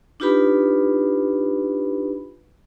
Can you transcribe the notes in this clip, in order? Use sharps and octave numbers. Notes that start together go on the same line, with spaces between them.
D4 D#4 F4 G4 B4 B5